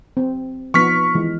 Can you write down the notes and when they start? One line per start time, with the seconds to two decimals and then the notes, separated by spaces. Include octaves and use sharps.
0.17 C4
0.74 F3 B3 D#4 C#6 F6 B6
1.15 D#3 E3 G#3